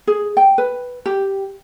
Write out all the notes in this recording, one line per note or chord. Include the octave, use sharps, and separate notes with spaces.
G#4
G5
B4
G4